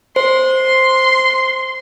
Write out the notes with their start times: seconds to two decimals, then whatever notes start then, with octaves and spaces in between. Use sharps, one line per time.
0.16 C5 C6